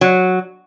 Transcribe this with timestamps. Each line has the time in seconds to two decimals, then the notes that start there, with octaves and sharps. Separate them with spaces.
0.01 F#3